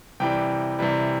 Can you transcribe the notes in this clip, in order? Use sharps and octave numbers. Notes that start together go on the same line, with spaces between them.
C3 E3 G3 G5
C3 E3 G3